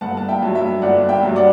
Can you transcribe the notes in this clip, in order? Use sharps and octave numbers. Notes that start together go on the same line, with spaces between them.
G1 F#5 A5
A5
E5 G5
G2 F#3
E5
G1 D5 F#5
E5 G5
G2 F#3
D5 F#5